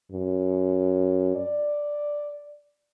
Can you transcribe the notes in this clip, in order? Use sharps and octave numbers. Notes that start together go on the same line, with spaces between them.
F#2
D5